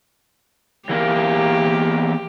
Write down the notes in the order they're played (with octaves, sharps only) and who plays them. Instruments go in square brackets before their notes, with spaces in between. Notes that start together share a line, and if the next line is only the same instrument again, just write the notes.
[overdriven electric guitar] E2 A#3 [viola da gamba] G4